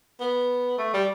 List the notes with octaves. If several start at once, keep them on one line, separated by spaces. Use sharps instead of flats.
B3
A3
G3